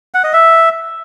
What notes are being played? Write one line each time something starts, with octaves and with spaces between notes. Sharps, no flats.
F#5
D#5
E5